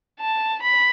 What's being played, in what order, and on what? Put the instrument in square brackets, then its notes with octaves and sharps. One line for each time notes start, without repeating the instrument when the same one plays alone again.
[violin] A5
B5